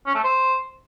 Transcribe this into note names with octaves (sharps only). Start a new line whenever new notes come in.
C#4
A3
C5